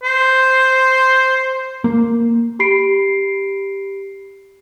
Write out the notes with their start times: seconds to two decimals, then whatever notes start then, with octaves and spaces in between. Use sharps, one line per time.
0.03 C5
1.84 A#3
2.59 G4 B5 C7 D7